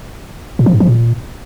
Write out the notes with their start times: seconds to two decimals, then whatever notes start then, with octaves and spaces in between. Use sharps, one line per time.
0.59 A#2
0.66 F3
0.73 G#2
0.80 F3
0.87 A#2